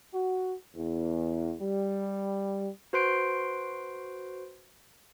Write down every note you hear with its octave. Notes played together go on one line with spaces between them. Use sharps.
F#4
E2
G3
F#4 B4 C5 C6 C7 D7